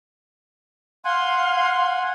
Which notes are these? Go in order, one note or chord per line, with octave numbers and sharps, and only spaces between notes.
F5 F#5 G#5 C6